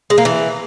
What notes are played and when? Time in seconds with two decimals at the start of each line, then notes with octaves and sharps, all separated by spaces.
0.10 G#3
0.18 A#3
0.25 E3